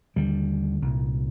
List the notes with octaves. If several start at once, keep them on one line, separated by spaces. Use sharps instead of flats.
D#2 D3 G3
C2 A#2